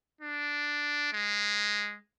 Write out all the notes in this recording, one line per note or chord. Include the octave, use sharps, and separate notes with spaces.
D4
G#3